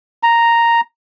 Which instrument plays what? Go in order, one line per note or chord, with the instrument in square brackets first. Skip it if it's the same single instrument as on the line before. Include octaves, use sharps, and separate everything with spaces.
[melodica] A#5